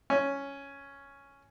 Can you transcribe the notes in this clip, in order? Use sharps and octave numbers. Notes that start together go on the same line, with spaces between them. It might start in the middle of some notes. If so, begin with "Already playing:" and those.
C#4